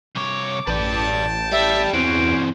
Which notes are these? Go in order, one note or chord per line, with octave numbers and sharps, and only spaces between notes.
C2 C#5 D6
A1 B4 D5 G5 A5
G3 E5
E2 E3 C4 C#4 F#4 C5 D7